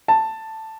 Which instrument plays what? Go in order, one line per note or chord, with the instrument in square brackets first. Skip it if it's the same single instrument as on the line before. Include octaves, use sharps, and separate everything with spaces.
[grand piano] A5